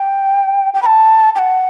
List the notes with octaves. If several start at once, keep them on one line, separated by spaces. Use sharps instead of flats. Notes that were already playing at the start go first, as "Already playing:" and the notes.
Already playing: G5
G5
B5
A5
G5
F#5